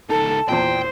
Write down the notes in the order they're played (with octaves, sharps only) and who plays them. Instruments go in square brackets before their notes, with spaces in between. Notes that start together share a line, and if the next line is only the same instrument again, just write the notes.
[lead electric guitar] C#2 D#4 [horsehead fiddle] A4 [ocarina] A5
[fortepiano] E2 A#2 [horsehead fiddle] C5 [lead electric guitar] G5